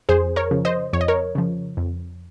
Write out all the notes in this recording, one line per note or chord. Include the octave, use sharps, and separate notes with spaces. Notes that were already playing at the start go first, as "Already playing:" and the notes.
F2 G#4 C5
A#4 C#5
C#3 F3
C5 D#5
F2 C#5
D#5
A#4 C#5
C#3 F3
F2